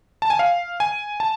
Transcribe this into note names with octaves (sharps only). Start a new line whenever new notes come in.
A5
G#5
F5
G#5
A5